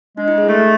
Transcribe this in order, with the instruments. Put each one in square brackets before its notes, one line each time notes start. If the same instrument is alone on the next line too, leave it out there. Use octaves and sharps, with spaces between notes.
[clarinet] G#3 [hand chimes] D4
[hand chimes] E4
G#4
[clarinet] A3 [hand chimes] A4